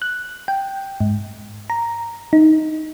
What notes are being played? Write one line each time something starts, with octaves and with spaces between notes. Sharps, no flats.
F#6
G5
G#2
A#5
D#4